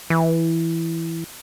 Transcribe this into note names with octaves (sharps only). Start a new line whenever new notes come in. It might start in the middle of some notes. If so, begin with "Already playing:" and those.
E3